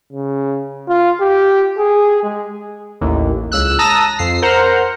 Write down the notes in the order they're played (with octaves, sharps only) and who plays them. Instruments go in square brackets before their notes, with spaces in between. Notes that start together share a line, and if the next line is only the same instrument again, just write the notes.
[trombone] C#3
F4
G4
G#4
G#3
[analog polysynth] A1 D#2
C#2 E6 F#6
A5 A#5 D#6 E6 A#6
F2 C7
A#4 C5 F#5 A#5